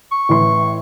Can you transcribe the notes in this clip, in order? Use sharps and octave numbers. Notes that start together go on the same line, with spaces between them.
C#6
A1 E3 C6